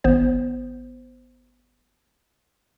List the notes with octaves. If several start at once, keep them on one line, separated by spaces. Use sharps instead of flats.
G#1 B3 C5